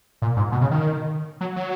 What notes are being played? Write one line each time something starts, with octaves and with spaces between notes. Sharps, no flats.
A#2
G#2
B2
C#3
D#3
F#3
F#3